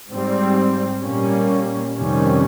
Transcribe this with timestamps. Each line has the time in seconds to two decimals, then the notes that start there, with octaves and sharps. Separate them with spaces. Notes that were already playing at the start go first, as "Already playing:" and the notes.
0.11 G#2 G3 C4
1.03 A#2 G3 A#3 C#4
1.96 F2 C3 D#3 G3 C#4